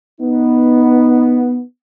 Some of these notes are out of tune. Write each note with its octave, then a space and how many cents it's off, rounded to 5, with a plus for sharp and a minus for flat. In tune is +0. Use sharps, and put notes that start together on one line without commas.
B3 +0 D#4 +0